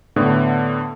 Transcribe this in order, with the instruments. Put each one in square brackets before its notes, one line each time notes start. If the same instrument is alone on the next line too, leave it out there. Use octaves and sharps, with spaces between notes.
[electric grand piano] A2 D3 A3 B3